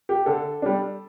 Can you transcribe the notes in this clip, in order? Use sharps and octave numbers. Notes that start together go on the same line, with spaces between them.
G4
D3 A4
G3 D4